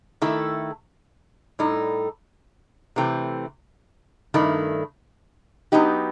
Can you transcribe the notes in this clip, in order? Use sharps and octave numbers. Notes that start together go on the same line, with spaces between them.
D#3 A3 E4 A4
A2 G3 D#4 A4
C3 E3 A3 C4
G2 D#3 A3 E4
F#3 B3 D#4 G4